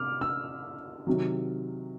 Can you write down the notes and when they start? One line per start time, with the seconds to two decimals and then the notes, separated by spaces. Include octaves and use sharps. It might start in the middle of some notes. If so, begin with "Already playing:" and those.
Already playing: C3 D6 F6
0.21 E6
1.07 C3 D#3 F#3